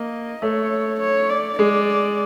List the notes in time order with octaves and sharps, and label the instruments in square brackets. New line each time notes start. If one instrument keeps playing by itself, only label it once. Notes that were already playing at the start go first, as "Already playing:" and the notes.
Already playing: [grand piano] A#3 [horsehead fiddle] D#5
[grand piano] A3 [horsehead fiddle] C#5
[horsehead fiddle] C#5
D5
[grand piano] G#3 [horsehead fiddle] D5